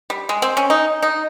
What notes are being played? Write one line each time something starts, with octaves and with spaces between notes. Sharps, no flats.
G3
G#3
C4
C#4
D#4
D#4